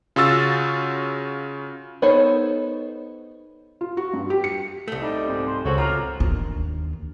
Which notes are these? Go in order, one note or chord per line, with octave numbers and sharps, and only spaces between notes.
C#3 F4 F#4 E6 A6
B3 D#4 A4 C5 C#5
F4
F#4
G2
G4
C#7
C2 A3
G3 D#4
G#2 C4
C5
C#2 F#4 A4 C5 C#5
F4 A#5 D6 F6
D#2 D4